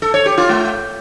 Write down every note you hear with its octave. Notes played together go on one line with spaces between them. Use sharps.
A4
C#5
G4
F4
A3